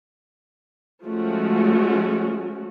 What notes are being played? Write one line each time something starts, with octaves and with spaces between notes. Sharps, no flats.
F3 G#3 A3 C#4 F#4